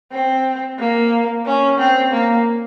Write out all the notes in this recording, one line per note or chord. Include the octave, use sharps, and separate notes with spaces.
C4
A#3
C#4
C4
A#3